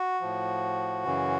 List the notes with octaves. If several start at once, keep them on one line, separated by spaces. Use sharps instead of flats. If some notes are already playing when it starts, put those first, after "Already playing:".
Already playing: F#4
A2 F3
F#2 C#3 E3